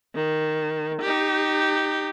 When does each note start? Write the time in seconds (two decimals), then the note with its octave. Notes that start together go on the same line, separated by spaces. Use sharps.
0.15 D#3
1.01 D#4 G4